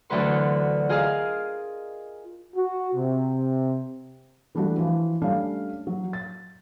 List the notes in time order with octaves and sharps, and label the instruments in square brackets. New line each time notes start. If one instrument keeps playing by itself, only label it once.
[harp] D2 D3 E3 F#3 B4 C6
F4 G#4 A#4 D#5 F5
[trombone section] F#4
C3
[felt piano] E3 G3 A3 D4 F#4
E3 F3
G3 A3 C#4 D4 F5
F#3
A6